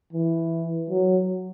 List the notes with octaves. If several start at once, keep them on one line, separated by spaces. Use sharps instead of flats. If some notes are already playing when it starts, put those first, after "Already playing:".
E3
F#3